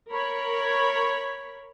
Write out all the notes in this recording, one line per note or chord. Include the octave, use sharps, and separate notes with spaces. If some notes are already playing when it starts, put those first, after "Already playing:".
A#4 C#5 B5